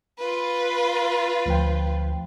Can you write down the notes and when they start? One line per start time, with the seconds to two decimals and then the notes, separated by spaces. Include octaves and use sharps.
0.19 F4 B4
1.46 D2 F3 G5